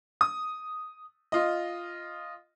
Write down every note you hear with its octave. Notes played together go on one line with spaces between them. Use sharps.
D#6
F4 D#5